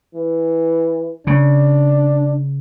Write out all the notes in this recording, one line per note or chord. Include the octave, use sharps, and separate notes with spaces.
E3
C#3 D4